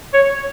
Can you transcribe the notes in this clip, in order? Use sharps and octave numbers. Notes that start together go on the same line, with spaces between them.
C#5